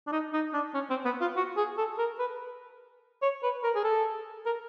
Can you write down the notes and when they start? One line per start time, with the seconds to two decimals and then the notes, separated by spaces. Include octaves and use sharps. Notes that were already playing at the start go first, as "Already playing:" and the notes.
0.07 D4
0.12 D#4
0.33 D#4
0.53 D4
0.74 C#4
0.90 C4
1.05 B3
1.21 F4
1.36 F#4
1.57 G#4
1.77 A4
1.98 A#4
2.19 B4
3.22 C#5
3.43 B4
3.63 A#4
3.75 G#4
3.84 A4
4.46 A#4